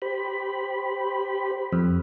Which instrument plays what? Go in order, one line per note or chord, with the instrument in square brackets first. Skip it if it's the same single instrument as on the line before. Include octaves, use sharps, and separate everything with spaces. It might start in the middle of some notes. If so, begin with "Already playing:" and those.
[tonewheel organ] G4 C5 B5
[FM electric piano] F2